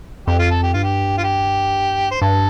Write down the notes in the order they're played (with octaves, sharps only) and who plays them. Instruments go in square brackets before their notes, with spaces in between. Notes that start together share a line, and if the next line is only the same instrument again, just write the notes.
[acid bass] F2 [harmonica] G4
[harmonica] F4
A4
G4
[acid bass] G2 [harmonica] F4
[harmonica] G4
F4
G4
C5
[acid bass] G2 [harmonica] A4